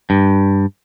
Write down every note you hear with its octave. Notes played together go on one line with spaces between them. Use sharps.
G2